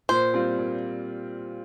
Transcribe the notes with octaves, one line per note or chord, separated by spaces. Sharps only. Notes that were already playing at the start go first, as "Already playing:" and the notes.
A#2 C5
G3 C4 F4
A#2